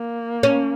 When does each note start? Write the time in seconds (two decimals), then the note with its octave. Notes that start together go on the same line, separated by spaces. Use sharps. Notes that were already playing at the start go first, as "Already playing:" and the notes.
Already playing: A#3
0.43 C#4